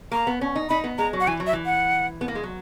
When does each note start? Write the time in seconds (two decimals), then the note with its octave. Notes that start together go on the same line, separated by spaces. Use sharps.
0.11 A#3 A#5
0.27 B3
0.41 C#4
0.55 D#4
0.69 D#4 B5
0.84 B3
0.98 G#3 A#5
1.13 F#3
1.20 F#5
1.27 E3 G#5
1.40 F#3
1.47 E5
1.53 E3
1.66 F#5
2.21 B3
2.28 A#3
2.35 G#3
2.43 F#3